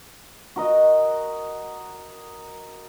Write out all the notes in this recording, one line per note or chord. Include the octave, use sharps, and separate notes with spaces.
F#4 A#4 D#5